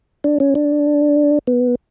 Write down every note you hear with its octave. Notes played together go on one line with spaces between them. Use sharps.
D4
C#4
D4
B3